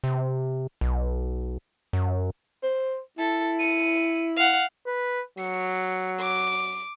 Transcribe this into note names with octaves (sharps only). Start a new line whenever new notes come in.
C3
B1
F#2
C5
E4 A4
C#7 D#7
F5 F#5
B4
F#3 C#7
D6